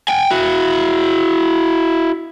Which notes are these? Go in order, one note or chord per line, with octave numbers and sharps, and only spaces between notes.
G5 G#5
E4 F#4